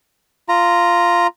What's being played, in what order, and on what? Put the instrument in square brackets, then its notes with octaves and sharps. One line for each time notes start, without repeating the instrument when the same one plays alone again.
[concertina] F4 A#5